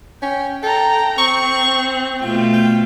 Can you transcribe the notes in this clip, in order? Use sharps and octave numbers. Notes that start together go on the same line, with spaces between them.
C#4 G5
A4 G5 A#5
C4 C#6
B2 A3 F4 G5
G5